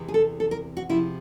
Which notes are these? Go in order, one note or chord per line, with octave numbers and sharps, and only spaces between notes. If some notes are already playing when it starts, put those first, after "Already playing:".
Already playing: E2 C3 E3 G#3
G#4
A4
A4
A#4
F#4
C3 F3 G#3 E4